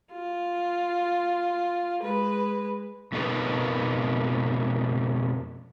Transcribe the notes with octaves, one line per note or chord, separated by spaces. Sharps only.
F4
G#3 B4
F2 B2 A#3 D#4 A4 B4